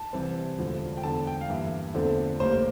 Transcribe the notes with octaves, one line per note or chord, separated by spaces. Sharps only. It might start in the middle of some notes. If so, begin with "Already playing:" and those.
Already playing: A5
C2 C3 E3 G3 C4
E1 D2 D3 F3 A3
G5
E2 D3 F3 A5
G5
F5
G2 E3 A#3 E5
E2 D3 F3 A3 C4
A1 A2 G3 A#3 C5